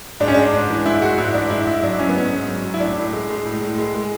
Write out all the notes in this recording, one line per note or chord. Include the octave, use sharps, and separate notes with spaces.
G#2 D4
C#4
G#3 D4
G#2
E3
G#2 E4
G#3 F#4
G#2 E4
E3 D4
G#2 E4
G#2 E4
F#3 D4
F#3 C#4
B3
G#2 C#4
G#2
F#3
F#3
E4
A2 D4
A2
G#3
G#3
A2
A2
G#3
G#3